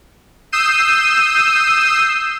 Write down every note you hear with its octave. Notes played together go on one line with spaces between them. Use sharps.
D#6 E6 G6 C7 D#7 E7